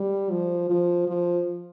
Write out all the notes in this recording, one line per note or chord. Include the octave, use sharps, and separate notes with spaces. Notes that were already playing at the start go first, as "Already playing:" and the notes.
Already playing: G3
F3
F3
F3